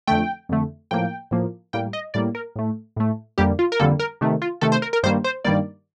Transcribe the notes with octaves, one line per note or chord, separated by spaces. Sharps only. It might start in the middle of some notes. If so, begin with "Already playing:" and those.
F2 D3 A3 G5
F2 D3 A3
A2 F3 A#3 G5
A2 F3 A#3
A2 G3 A#3 G5
D#5
A2 G3 A#3 D5
A#4
A2 A3
A2 A3
F2 D3 G3 A#3 G4
F4
A#4
F2 D3 G3 A#3 A4
A#4
C3 D#3 A3
F4
C3 D#3 A3 A4
C5
A#4
A#4
G2 D#3 G3 A#3 C5
C5
G2 D#3 G3 A#3 D5